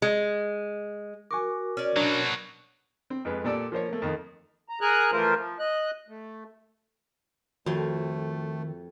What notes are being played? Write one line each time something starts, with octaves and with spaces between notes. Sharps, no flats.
G#3
F#4 A#4 G#5 C#6 D6
C#4 D5
B2 F#3 D4
C4
F2 G#3 B4
A#2 G4 A4 D5 D6 E6
F3 A#3 C5 C#5
A3 A#3
F2 D#3
A#5
G#4 A#4 G#5 A#5 F#6
E3 F3 A3 F4 A#4 C5
F3
D#5 F#6
A3
F2 D#3 A3 F4 F#4 C#5 C6